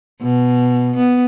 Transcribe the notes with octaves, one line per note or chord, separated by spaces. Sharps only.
B2
B3